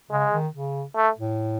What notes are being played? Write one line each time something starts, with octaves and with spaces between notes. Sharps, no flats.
C#3 G#3
D#3
C#3
A3
A2